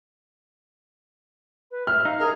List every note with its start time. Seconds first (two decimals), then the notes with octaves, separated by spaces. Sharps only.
1.71 B4
1.87 E5 F6
2.05 D#4 F5
2.20 G#4 A#4